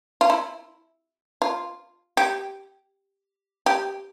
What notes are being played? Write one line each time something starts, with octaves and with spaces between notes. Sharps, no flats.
F4
E4
F4
G4
G4